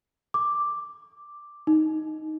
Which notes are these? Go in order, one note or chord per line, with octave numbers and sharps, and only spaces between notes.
D6
D#4